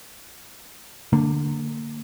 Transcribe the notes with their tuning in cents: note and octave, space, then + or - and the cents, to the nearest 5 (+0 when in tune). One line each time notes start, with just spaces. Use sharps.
D3 +0 A#3 -30